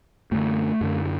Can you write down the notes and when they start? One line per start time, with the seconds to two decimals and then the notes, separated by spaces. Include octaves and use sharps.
0.31 F#2 D3 A3
0.81 F#2 D3